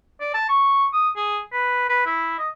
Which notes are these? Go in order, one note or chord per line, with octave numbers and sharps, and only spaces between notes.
D5
A5
C#6
D#6
G#4
B4
B4
E4
D#5